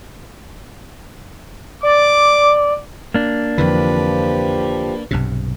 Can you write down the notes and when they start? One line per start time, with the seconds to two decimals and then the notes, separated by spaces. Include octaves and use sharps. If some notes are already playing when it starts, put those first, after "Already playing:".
1.83 D5 D6
3.14 A#3 D4
3.58 F2 D3 E3 F3 G4 B4
5.11 B1 G2 C3